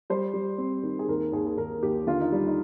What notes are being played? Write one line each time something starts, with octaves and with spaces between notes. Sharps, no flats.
G3 C5
G3
C4
D#3
G#4
D#2 A#4
D#2 G#4
G#4
D#2 A#4
D#2 G4
D3 F4
D#4
G3
D#4